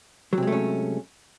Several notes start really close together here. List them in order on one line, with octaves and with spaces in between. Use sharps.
F#3 C3 G#3 A3 C#4